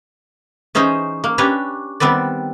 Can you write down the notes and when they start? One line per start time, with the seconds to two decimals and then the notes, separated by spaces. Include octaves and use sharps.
0.75 E3 C#4 D#4 G#4 C5
1.24 A#3
1.38 C#4 D4 G4 B4 C#5
2.00 D#3 G3 B3 C4 B4 D5